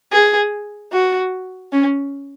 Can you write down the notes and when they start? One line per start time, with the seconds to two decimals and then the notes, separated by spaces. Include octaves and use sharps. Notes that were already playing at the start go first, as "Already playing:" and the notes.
0.12 G#4
0.92 F#4
1.72 C#4